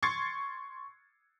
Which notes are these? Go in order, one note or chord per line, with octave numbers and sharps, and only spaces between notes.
C6 C#6 G#6 A6 C7 C#7